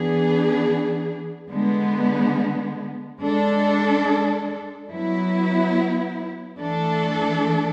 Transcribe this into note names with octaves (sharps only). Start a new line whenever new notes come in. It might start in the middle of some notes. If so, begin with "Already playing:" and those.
Already playing: E3 B3 D4 G#4
D3 G#3 B3
G#3 D4 A4
F#3 B3 E4
E3 A3 D4 A4